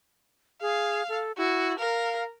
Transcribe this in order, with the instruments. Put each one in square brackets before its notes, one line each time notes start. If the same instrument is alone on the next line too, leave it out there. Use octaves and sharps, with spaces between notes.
[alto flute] G#4 [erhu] F5
[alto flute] A4
[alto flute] E4 [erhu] F#4
[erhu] A#4 [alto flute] F5